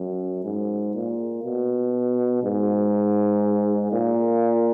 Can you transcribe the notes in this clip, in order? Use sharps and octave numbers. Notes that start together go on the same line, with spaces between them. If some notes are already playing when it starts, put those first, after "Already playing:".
Already playing: F#2
G#2
A#2
B2
G#2
A#2